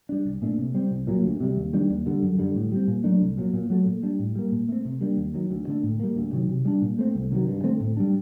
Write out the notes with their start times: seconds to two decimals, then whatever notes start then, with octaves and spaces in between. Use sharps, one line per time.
0.09 G3 D4
0.25 C2
0.42 A#2 A3 D4
0.58 C3
0.74 G3 C4
0.91 C2
1.07 A#2 F#3
1.24 D2
1.40 C3 G3
1.57 D#2
1.73 D#3 G3 D4
1.90 D#2
2.06 D3 G3
2.22 F#2
2.39 D3 G3
2.55 A2
2.72 G3 C4
2.88 A#2
3.04 F#3 A3 D4
3.21 C2
3.37 A#2 F#3
3.53 A#2
3.70 F#3 A3
3.86 A#2
4.03 G3 D4
4.19 A2
4.36 G3 A#3
4.52 A#2
4.69 A3 C4
4.85 C3
5.01 G3 A#3 D4
5.17 D#2
5.34 D#3 F#3
5.50 D2
5.67 D3 A3 D4
5.83 A2
5.99 G3 A#3
6.16 D2
6.33 C3 D#3 F#3
6.49 C3
6.65 G3 D4
6.82 A#2
6.99 A3 C4
7.15 C2
7.31 C3 D#3 F#3
7.47 G2
7.63 D3 A3 C4
7.80 A2
7.97 G3 D4